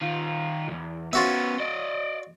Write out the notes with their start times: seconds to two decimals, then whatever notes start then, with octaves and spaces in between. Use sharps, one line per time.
0.02 D#3 F4
0.68 B1 E2
1.13 B3 C#4 F4 F#4 E5
1.60 D5 D#5